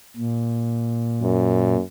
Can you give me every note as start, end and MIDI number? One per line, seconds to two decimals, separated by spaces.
0.17 1.76 46
1.22 1.82 42